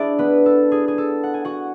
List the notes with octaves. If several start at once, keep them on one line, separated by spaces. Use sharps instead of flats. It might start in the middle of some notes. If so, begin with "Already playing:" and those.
Already playing: D4 E4 G#4 D5 E5
B3 B4
A4
G#4
G#4
A4
F#5
G#5
F#4 F#5